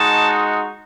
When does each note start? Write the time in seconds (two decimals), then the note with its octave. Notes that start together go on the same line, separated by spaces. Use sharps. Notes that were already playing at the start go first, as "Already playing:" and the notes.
Already playing: G#3 D#4 F#4 A5